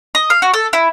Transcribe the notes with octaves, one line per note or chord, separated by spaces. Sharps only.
D#5
F5
F#4
A4
E4